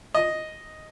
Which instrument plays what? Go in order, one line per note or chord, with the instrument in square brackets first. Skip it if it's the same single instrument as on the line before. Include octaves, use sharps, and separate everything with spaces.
[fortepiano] D#5